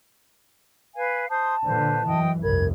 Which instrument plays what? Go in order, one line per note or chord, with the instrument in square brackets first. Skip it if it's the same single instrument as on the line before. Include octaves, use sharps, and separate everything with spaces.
[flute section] B4 F5 G#5
[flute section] C5 C6 D#6 [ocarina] A5
[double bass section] A#2 D3 [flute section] B4 C5
[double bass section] F#2 E3 [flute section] D#5 G5 D#6
[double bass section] F1 C2 G2 [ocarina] A#4 [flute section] B5 G#6